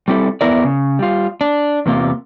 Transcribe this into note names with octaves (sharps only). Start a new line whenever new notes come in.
G3 C4 E4 A4
E2 C#3 B3 E4 A#4 D5
C#3
G3 F4
D4
E2 C3 A#3 F4